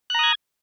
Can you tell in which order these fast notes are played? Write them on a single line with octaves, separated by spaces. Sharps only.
F#6 A#5 D#6 G#6